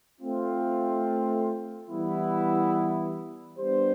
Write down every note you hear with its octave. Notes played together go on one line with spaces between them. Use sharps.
A3 C4 F4
E3 G3 B3 E4
G3 B3 D4 G4 C5